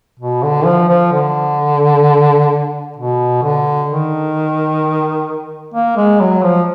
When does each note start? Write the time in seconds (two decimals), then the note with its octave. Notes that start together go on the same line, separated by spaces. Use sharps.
0.19 B2
0.43 D3
0.66 F3
0.88 F3
1.12 D3
2.97 B2
3.43 D3
3.89 D#3
5.74 A#3
5.97 G#3
6.20 F#3
6.43 F3